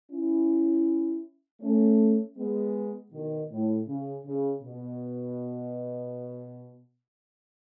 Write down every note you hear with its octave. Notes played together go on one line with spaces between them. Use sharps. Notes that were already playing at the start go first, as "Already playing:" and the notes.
C#4 E4
A3 C#4
G#3 B3
B2 D#3
A2
C#3
C#3
B2